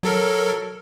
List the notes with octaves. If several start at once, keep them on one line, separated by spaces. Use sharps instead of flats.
F#3 A4 A#4